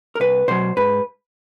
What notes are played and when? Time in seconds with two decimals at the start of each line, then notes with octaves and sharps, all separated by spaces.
0.15 A#4
0.20 C2 B4
0.48 B2 F#3 C5
0.77 G#2 B4